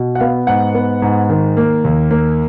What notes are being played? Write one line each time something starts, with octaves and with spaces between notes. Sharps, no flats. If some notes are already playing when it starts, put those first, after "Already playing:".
Already playing: B2
F#5
B3 F5
G#2 F#5
B3
G#2
D#3
A#3
D#2
A#3